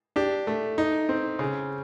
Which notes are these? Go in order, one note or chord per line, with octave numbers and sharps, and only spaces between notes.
D4 G4
A3
D#4
C4
C#3